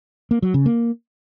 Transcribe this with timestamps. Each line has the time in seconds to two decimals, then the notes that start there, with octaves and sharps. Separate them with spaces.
0.31 A#3
0.42 F#3
0.54 C#3
0.66 A#3